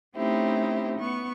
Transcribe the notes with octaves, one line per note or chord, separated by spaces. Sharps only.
A3 C4 C#4 D#4 E4 G4
B3 C#6